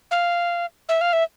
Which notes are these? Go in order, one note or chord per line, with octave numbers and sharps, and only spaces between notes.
F5
E5
F5
E5